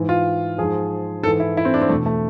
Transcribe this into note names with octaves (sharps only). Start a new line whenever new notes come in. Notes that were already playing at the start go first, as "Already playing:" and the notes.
Already playing: G#2 E3
F4
G#2 F3 G#4
G#2 E3 A4
E4
E4
C4
D4
C4
E2 B2 A3
A3